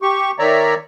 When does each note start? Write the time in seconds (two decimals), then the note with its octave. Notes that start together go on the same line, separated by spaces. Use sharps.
0.02 G4 C#6
0.39 D#3 C#5 D5 E5 A#5